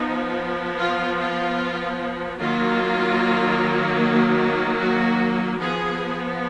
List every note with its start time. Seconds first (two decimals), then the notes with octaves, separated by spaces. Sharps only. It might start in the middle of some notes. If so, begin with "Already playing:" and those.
Already playing: F3 B3 D#4
0.78 F4
1.19 F4
2.39 D#3 F#3 A#3 F4
4.80 F#4
5.60 F3 B3 G#4